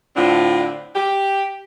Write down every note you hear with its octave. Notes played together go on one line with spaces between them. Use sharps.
A2 D3 C4 D4 F4
G4